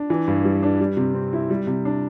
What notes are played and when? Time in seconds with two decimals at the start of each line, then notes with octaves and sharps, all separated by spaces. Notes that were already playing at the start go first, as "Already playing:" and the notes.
Already playing: D4
0.10 E3
0.28 G2
0.45 G3
0.63 D4
0.80 G3
0.97 C3
1.14 C4
1.33 E4
1.50 G3
1.67 C3
1.85 D4